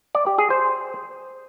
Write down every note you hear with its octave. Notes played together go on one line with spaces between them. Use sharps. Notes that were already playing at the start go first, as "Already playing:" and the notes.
D5
G4
G#4
C5